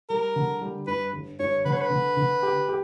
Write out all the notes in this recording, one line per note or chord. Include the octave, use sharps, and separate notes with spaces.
G3 A#4
D3
G3
G2 B4
G1
G2 C#5
D3 B4
C#5
B4
D3
D3
G4
G4